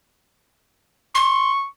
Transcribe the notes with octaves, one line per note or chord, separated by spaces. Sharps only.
C6 C#6